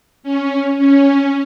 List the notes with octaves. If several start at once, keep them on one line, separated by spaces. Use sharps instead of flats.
C#4
C#4